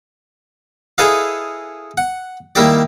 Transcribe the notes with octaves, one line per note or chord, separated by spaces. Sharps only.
E4 G#4 A4 B4 D#5 F5
F#5
D#3 G3 A#3 E4 G4 D5